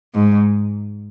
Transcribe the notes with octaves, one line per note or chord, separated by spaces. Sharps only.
G#2